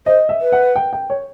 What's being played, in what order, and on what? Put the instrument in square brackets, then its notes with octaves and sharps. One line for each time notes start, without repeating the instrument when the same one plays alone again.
[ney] C5 [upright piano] D#5
[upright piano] E5
[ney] B4
[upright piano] F#5
G5
G5
C#5